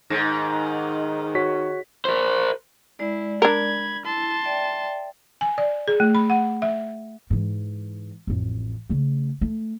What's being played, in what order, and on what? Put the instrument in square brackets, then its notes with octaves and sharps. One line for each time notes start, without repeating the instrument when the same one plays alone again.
[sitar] G#2 [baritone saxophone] D#3 [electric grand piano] A#6
[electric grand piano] F#4 C#5 B6
[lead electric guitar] A#4 C5
[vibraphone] G#3 D5 [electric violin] E4
[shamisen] D4 A#4 [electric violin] B5 G#6
[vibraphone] E4 [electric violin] A5 C6
[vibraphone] D5 E5 G5
[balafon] G#5
D5
G#4
A3
B5
F#5
E5
[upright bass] G#2 E3
A1 F2
C#3 A3
A3